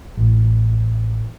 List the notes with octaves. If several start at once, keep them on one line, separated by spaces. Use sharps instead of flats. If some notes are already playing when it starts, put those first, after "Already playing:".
A1